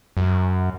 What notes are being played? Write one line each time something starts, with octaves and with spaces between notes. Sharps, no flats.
F#2